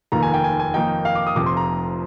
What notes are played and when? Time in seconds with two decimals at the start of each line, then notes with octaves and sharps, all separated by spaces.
0.12 F1 D#2 D#3 A#3 F4 A#5
0.23 G#5
0.34 G5
0.44 G#5
0.60 G#5
0.74 F2 D#3 A#3 D#4 G5
1.05 F5
1.15 D6
1.27 D#6
1.36 F1 F2 C3 F3 D6
1.46 C6
1.57 A#5